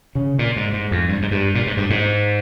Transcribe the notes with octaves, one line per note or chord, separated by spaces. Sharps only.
C#3
A#2
G#2
G#2
F2
G2
G#2
G2
A#2
G#2
G2
G#2